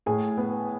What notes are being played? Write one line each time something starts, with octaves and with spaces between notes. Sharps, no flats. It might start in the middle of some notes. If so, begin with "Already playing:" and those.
A2 G#4 G#5
B3